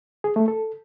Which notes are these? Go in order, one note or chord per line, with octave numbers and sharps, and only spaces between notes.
G#4
A3
A4